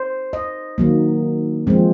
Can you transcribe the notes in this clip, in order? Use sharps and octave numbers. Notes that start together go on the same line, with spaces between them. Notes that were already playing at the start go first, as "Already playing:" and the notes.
Already playing: C5
D#5
D#3 F#3 A#3
F3 G#3 C4